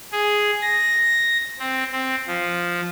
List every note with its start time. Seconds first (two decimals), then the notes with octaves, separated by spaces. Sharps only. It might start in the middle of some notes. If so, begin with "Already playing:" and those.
0.12 G#4
0.62 A#6
1.59 C4
1.92 C4
2.27 F3